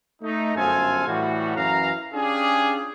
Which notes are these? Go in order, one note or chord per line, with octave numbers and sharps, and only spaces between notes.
A3 D#4
G1 F#2 A4 C5 F5 G#5
A2 E3 G3 F#4
F#2 E3 F5 A#5
C#4 D4 F4 G4 G#4